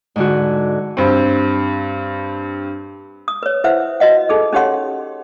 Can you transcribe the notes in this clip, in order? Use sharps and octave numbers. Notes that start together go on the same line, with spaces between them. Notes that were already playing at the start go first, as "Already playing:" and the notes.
G#2 D3 F#4
G2 C4
D#6
B4 C#5
E4 B4 C5 E5 F#5
F#4 B4 D#5 F#5
D#4 G#4 A4
C#4 D#4 G4 C#5 F#5 C6